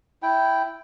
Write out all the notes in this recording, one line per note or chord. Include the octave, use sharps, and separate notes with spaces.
E4 G5